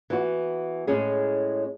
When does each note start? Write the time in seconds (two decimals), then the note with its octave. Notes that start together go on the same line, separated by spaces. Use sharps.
0.10 E3 B3 F#4
0.87 A2 G#3 C#4 G#4